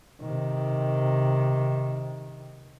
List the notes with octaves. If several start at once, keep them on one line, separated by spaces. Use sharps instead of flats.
C3 D#3